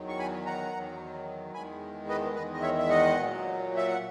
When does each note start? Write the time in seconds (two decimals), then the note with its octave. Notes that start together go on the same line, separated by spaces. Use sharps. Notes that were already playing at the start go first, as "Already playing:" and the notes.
Already playing: E2 D#3 F#3
0.08 C#6
0.19 G#5 B5
0.46 F#5 A#5
0.73 E2 D#3 F#3
1.54 E2 D#3 G#3 G#5 B5
2.09 B4 D#5
2.35 E2 D#3 G#3 B4 D#5
2.53 D#5
2.62 C#5 E5
2.78 E5
2.89 D#5 F#5
3.17 A#2 F#3
3.77 E5
3.87 F#5